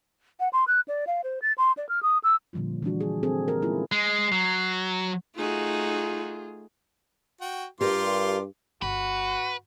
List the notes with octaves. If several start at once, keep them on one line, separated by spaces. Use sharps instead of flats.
F#5
C6
F#6
D5
F5
C5
A6
C6
D5
F6
D#6
E6
A#2 D3 F3 G3 F4
E3 G3 D4 F#4
G#4
C4 G#4 A4
G4 A#4
G#3 C#4 E4 F4 G#4
G#3 C7
F#3
A3 D#4 F4 F#4 G#4
F#4 G5
G2 F4 G4 A#4 C6 D6
G1 F#4 B4